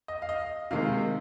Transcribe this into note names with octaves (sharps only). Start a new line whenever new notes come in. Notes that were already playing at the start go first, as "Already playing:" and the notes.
D#5
F5
D#5
C3 D#3 G#3 F5